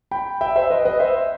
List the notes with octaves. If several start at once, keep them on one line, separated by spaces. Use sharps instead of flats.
G5 B5
E5 G5
C5 E5
B4 D#5
B4 D#5
C5 E5